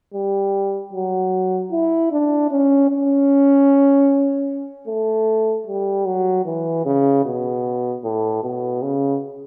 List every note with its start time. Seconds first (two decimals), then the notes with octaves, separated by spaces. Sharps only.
0.14 G3
0.93 F#3
1.72 E4
2.12 D4
2.51 C#4
2.90 C#4
4.88 A3
5.67 G3
6.06 F#3
6.45 E3
6.86 C#3
7.25 B2
8.04 A2
8.43 B2
8.82 C#3